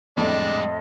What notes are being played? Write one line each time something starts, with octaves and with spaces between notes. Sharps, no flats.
F2 A2 G3 G#3 D4 D#5